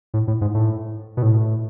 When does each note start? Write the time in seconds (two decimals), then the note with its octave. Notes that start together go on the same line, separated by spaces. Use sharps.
0.14 A2
0.28 A2
0.41 G#2
0.55 A2
1.17 B2
1.22 A2